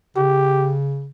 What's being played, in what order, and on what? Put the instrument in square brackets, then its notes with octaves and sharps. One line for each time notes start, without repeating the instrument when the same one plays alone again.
[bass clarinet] C#3 [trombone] G4